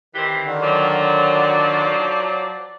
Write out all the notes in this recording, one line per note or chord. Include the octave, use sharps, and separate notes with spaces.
D#3 E3 C4 G4
D3 D#3
F3 F#3 D5